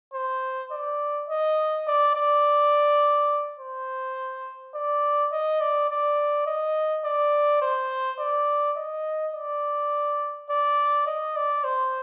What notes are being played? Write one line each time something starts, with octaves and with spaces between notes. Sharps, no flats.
C5
D5
D#5
D5
D5
C5
D5
D#5
D5
D5
D#5
D5
C5
D5
D#5
D5
D5
D#5
D5
C5